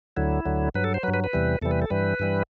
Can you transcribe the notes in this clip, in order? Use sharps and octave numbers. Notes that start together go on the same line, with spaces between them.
D2 D3 F#3 E4
D2 D3 F#3
G2 F#3 B4
A4
C5
G2 F#3 B4
B4
B4
E2 C3 E3 G3
E2 C3 E3 G3 A4
B4
A4
G2 E3 G3 B4
G2 E3 G3